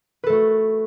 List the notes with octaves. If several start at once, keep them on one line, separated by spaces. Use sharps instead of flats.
A3 F#4 A4 B4